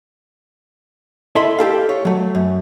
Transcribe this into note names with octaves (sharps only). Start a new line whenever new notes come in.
E4 A4 D#5 E5 B5 C6
G4 A4 F5
C#5
F#3 A3
F#2